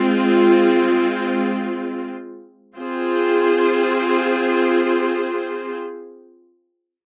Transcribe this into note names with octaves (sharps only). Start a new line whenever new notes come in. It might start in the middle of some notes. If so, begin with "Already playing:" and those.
Already playing: G#3 C4 F4
C4 F4 G#4 C5